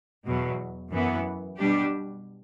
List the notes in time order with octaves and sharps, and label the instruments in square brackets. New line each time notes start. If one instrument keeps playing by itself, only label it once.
[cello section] E2 B2 F#3
F#2 E3 B3
B2 G3 D4 G4